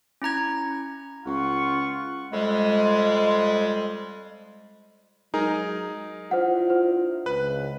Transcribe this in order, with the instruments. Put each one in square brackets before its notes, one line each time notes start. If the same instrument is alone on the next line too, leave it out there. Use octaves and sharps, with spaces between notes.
[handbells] C#4 E4 A#5 G#6
[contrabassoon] C#2 [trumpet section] F4 F#5 C#6
[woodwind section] F2 G3 G#3
[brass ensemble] F#3 G#3 [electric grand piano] D#4 G#4 A#4
[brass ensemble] D4 E4 F4 [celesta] C5 F#5
[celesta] C5
[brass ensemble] C#2 [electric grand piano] B4 F#6